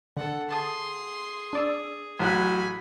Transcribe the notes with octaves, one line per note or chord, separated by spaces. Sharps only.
D3 A4 F#5
G#4 A5 C6 D#6
D4 D5 E6
A1 F#3 G#5 B5 F#6